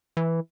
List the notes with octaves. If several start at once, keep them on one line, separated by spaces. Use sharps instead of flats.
E3